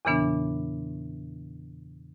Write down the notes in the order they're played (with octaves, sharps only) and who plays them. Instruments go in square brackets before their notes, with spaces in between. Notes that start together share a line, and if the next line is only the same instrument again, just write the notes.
[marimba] E2 A#2 C#3 E3 B3 D4